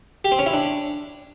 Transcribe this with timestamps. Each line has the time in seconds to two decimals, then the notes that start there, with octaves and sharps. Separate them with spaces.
0.25 G4
0.32 C4
0.39 C#4
0.46 E4
0.54 D4